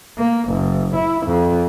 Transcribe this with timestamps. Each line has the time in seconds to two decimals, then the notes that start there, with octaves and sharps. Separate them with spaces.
0.18 A#3
0.49 F#1
0.95 E4
1.26 F2